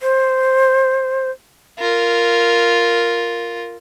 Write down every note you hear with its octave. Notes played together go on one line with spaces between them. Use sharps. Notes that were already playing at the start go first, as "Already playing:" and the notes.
C5
F4 A#4